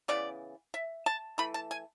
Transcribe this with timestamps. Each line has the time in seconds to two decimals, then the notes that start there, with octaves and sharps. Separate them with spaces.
0.08 C#3 E3 B3 D5
0.74 E5
1.06 A5
1.38 E3 A3 B5
1.54 A5
1.71 G#5